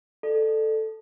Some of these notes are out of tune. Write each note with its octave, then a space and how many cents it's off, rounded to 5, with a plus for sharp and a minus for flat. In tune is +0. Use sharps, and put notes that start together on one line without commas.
A4 +0 D5 +35